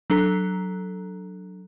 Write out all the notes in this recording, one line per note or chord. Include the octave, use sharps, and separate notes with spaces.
F#3 D4 A4 A#5 F#6 B6